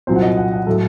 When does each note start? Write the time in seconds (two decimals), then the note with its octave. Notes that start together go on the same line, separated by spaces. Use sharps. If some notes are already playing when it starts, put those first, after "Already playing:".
0.07 C2 A#2 F#3 C5
0.16 F#5
0.22 D#5
0.37 F#5
0.52 F#5
0.67 A2 F#3 A4